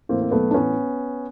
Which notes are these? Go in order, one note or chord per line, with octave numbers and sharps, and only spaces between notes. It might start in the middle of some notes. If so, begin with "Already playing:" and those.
A2 E3 A#3 C4
C4
B1 A3 B3
D4
A2 E3 B3 C#4